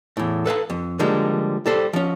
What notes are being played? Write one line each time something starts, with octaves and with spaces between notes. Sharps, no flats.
E2 A2
A4 B4 F5 A5
F2
D3 F3 G3 G#3 A#3
G3 A4 C5
F3 C#4